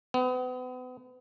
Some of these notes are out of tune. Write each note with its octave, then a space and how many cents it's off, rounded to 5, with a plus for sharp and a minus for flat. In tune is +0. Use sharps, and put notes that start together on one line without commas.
B3 +40